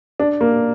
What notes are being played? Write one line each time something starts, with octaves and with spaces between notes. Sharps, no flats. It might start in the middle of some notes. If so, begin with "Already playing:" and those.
D4
A#3